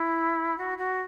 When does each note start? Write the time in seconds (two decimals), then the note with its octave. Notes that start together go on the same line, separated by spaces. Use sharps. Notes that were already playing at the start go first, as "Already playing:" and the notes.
Already playing: E4
0.58 F#4
0.78 F#4